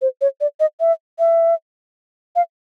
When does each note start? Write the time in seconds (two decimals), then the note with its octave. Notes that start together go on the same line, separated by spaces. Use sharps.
0.02 C5
0.21 C#5
0.41 D5
0.60 D#5
0.80 E5
1.19 E5
2.36 F5